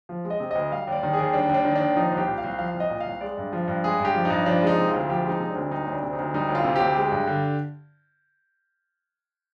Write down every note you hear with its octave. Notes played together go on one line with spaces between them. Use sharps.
F3
G#3
D#5
C3
D2 D#5
G3 F5
D#2 D5
D#3
G#4
D#2
G3 D4
D#2
D4
D#3
D4
D#2
F3 D#4
C2 G4
A#2
F5
C2
F3 F5
C2
D#5
A#2
F5
C2
G#3 D5
G2
F3
G2
G#3 G#4
G2
G4
F3
D#4
G2
F3 D4
G#3 D#4
C3
F4
D2
F3 G4
G#3 D#4
C3
D4
D2
G3 D#4
D2
D4
C3
D#4
D2
G3 D#4
D2
F4
C3
D2 G4
G#3
G2
D3